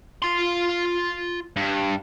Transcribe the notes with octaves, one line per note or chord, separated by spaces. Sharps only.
F4 C6
G2